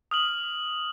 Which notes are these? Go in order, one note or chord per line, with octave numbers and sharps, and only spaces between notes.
D#6 F6 F#7